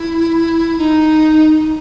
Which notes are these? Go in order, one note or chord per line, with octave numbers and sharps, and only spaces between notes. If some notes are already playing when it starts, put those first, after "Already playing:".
Already playing: E4
D#4